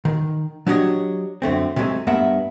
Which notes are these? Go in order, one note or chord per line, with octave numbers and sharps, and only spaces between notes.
D#3
F#3 D4 G4 C#5 D#5
F#2 D3 A3 C4
C3 F#3 G#3 A3 C#4
G2 A3 B3 A#4 E5 F#5